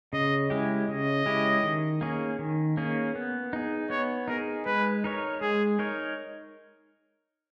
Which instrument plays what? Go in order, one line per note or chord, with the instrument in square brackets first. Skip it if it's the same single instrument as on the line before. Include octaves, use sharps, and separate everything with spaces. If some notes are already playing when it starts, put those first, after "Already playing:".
[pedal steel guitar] C#3 [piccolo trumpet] D#5
[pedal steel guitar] G#3 C#4 E4 G4
[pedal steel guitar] C#3 [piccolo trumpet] D#5
[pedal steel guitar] G#3 C#4 E4 G4
D#3
A#3 C#4 G#4
D#3
A#3 C#4 G#4
B3
D#4 G#4
[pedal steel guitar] B3 [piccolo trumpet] C#5
[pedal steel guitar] D#4 G#4 [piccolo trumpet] A#4
[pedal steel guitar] G#3 [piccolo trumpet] B4
[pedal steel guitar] D#4 A#4 C#5
[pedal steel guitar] G#3 [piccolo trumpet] G#4
[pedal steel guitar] D#4 A#4 C#5